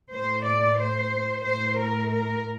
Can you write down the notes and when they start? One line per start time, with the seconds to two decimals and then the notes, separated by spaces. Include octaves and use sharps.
0.13 A2 C5
0.47 D5
0.80 C5
1.46 A2 C5
1.79 A#4
2.12 A#4